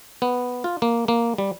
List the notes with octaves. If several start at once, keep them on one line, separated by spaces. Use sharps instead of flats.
B3
F4
A#3
A#3
G3